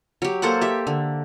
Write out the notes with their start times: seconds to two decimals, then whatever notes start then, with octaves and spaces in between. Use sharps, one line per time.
0.22 F#3 G4
0.42 A#3 A4 C5 F#5
0.61 G4 E5
0.87 D3